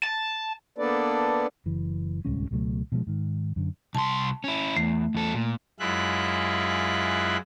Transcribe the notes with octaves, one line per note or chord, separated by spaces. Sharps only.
A5
A#3 B3 D4 A4 B4 D5
F#1 E3
D1 C2 G#3 C#4
C#2 B2 F#3 A3
B2 F3 G3 G#3
G#2 D#3
F#2 D3
C2 A5 C6
C#4 E4
E2 A3
E2 A4
A#2
F#2 G#3 E4 F4 E5 F#6